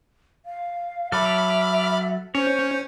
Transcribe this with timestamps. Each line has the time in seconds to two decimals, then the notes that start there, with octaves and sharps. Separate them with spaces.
0.46 F5
1.12 F#3 A4 E5 B5 D6 F6
2.35 C#4 C5 C#5